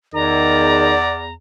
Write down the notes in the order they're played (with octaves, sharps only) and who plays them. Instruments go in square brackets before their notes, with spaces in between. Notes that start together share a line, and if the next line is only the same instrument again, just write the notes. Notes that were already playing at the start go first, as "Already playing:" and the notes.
[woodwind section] E2 [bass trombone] D#3 [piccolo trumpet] D5 [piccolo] A#5